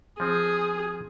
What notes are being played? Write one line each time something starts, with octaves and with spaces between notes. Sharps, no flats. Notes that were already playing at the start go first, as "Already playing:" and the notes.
F3 C4 G#4